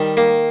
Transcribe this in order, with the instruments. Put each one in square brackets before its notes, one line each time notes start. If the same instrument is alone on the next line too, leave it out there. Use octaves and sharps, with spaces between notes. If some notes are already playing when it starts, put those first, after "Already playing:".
Already playing: [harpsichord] D#3 G3
A#3